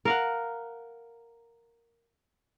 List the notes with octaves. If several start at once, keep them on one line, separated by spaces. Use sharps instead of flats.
A#4 F5 F#5